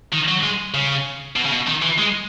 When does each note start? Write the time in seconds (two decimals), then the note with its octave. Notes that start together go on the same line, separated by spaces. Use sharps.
0.12 D#3
0.28 F#3
0.43 G#3
0.74 C#3
1.36 B2
1.45 C#3
1.52 B2
1.67 D#3
1.82 E3
1.98 G#3